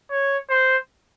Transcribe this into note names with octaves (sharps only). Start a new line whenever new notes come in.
C#5
C5